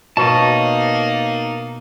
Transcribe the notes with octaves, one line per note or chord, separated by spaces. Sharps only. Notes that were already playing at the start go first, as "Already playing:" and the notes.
B2 A#3 D#4 C#5 A5